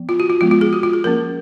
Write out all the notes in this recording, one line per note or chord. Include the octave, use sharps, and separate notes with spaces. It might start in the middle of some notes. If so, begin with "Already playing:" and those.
Already playing: F3 B3
F4
F#4
F4
F3 G#3 B3 F4
F4
G#4
F#4
F4
G#4
F3 A#3 C#4 A#4